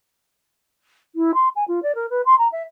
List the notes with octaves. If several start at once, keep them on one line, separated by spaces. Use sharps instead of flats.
E4
C6
G#5
F4
D5
A#4
B4
C6
A#5
E5